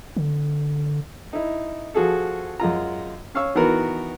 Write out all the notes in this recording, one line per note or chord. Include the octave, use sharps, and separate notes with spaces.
D3
D#4 E4
F3 F#4 G#4 A4
F#2 G#3 F4 A#5
C#4 F5 C#6 E6
D#3 E3 B3 F#4 A#4